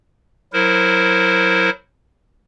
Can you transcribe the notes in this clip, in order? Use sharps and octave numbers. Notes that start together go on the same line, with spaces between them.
F#3 E4 A#4 C5